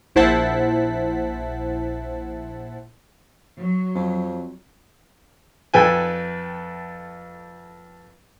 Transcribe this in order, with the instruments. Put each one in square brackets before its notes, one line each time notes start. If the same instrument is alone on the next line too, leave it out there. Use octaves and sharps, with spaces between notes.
[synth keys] A#1 E4 C5 F#5 A5 B6
[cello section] F#3
[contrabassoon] F2
[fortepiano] F2 A4 B4 G5 G#5